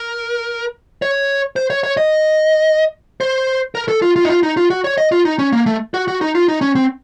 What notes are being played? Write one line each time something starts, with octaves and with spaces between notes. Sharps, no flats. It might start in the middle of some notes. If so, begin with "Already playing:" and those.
Already playing: A#4
C#5
C5
C#5
C#5
D#5
C5
A#4
A4
F4
F4
D#4
F4
D#4
F4
F#4
C#5
D#5
F4
D#4
C#4
A#3
A3
F#4
F#4
D#4
F4
D#4
C#4
C4